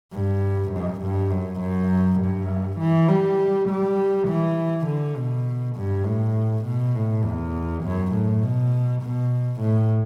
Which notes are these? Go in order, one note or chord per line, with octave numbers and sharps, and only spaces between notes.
G2
F#2
G2
F#2
F#2
G2
E3
G3
G3
E3
D3
B2
G2
A2
B2
A2
E2
F#2
A2
B2
B2
A2